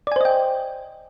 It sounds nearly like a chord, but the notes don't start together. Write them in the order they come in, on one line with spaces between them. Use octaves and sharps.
D5 G#5 C5 D#5 G5